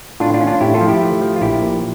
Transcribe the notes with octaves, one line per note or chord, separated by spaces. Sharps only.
A2 D4 F4
D4 F4
C#4
D4 F4
A2 E4 G4
F4 A4
F3
E4 G4
A3
F3
F4
A#1 E4 G4
A#2